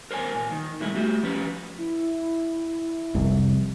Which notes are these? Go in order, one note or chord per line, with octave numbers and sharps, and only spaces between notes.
A#4 C5 C#5 G#5
A#2
D#3
A#2 D#3 G3 G#3 E4
A3 F#4 G4
F3 C#4 B4
E4
F1 C2